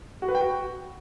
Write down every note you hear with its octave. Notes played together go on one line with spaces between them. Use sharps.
F#4
B4
G5
F#4